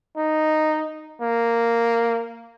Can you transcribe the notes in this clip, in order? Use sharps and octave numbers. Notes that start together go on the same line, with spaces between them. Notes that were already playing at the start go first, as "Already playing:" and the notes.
D#4
A#3